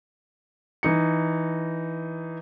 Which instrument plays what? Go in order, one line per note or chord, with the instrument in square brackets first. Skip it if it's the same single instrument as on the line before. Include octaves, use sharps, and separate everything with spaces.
[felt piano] E3 D#4 C#7